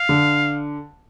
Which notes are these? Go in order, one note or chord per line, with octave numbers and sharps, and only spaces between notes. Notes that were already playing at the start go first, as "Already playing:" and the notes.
Already playing: F5
D3